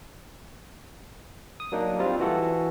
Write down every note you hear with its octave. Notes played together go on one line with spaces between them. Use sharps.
D#6
F#3 A#3 D4 D#4
G3 C4 F4
E3 F#4 A4